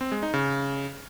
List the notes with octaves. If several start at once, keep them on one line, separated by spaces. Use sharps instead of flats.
C4
G#3
D#4
C#3